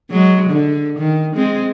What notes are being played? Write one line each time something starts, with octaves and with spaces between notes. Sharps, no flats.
F#3 G#3
D3
D#3
G#3 C4